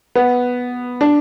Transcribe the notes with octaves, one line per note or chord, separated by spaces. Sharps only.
B3
D4